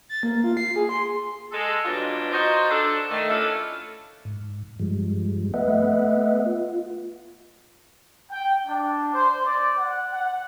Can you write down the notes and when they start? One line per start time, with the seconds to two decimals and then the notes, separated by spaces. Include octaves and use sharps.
0.09 A6
0.23 A#3
0.44 F4
0.57 C7
0.76 G#4
0.89 C6
1.52 G#3 A4
1.85 B2 E3 F#3 G3 D4 F4
2.32 D#4 F4 F#4 C5
2.71 D4 A4
3.11 D#3 A3
3.30 C#4 D4 E4 F4 A4
4.25 G#2
4.80 G2 F3 G3 G#3
5.54 A3 B3 B4 D#5 E5 F#5
6.46 F4
8.31 G5
8.67 D4
9.13 C5
9.45 D5
9.78 F#5
10.12 F#5